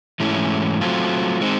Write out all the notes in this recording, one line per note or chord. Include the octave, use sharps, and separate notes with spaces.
G#2 E3 A3 C#4 E4
F#3 A3 C4 F4
G#3 C4 D#4